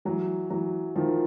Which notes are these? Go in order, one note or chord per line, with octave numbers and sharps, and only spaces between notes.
E3 F#3
E3 F#3
D#3 F3